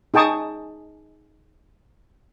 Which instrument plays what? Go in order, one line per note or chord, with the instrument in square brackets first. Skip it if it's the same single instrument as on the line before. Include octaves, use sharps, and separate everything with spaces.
[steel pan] D#4 G#4 G5 A5 C#6 D#6